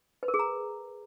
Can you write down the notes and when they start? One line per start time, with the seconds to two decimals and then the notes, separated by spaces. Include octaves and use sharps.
0.23 B4
0.28 A#4
0.34 G#4
0.39 A#5